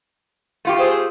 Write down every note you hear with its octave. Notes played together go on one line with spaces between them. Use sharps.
A3 F4 G4
G#4 C5